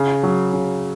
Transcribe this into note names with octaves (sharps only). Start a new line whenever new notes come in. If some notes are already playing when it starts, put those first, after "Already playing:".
Already playing: C#3
F#3
C#3